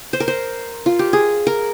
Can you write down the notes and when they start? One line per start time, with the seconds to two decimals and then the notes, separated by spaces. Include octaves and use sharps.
0.13 C5
0.20 A#4
0.28 C5
0.86 F4
0.99 G4
1.13 G#4
1.47 A#4